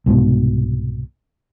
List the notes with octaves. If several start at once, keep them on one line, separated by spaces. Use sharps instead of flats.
C2 G#2 B2